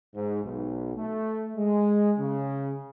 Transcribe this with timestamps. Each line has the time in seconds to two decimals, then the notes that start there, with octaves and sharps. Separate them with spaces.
0.15 G#2
0.44 B1
0.95 A3
1.57 G#3
2.19 C#3